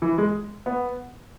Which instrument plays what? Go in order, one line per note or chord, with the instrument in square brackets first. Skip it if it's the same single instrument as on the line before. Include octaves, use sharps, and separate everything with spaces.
[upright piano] E3
G#3
B3